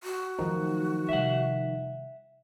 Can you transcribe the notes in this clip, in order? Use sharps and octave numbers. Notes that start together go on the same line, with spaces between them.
F#4
D#3 F3 F#3 A3 D#4
C3 G3 E5 F#5